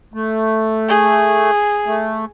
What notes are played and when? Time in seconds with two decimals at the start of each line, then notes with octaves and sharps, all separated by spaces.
0.14 A3
0.89 G#4
1.86 A3